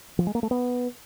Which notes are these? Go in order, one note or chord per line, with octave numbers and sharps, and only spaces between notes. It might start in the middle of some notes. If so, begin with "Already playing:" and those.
F3
G#3
A#3
A3
B3